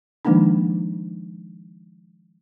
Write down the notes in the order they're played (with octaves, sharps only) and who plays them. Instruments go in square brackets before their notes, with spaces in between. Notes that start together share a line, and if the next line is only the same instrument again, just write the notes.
[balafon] D#3 F3 G#3 A#3 D4 D#4